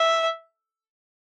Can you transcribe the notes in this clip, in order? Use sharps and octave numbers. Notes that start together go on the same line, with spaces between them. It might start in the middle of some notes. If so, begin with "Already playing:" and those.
Already playing: E5